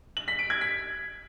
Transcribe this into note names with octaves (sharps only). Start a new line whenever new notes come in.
F#7
B6
D7
G#6
B6